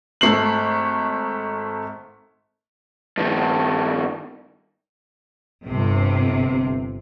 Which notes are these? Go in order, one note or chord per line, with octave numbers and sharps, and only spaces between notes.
G#1 A3 C7 F#7
G2 D#3
G1 C3